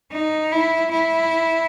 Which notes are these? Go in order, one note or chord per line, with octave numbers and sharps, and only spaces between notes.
D#4
E4
E4